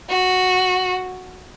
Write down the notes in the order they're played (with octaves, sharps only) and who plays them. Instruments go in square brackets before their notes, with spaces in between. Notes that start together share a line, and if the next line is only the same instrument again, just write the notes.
[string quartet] F#4